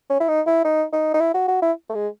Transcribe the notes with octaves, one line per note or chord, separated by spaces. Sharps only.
C#4
E4
D#4
E4
D#4
D#4
D#4
E4
F#4
F#4
E4
A3
G#3